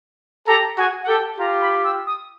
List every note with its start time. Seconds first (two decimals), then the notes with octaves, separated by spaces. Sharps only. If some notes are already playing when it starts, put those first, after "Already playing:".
0.47 G4 A4 A#5
0.78 F#4 G#4 G#5
1.03 F#5
1.08 G4 A4 G5
1.38 F4 G4 A#5
1.61 B5
1.84 E6
2.07 D#6